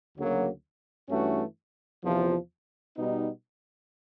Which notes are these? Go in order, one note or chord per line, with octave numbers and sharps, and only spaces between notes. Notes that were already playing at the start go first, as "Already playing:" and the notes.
D2 C#3 F#3 A#3
G2 E3 A3 C#4 F#4
E2 C3 F3
B2 G3 B3 D#4